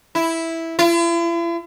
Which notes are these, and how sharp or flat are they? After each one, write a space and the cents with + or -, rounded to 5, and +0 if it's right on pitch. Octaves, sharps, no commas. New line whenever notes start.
E4 -5
E4 +45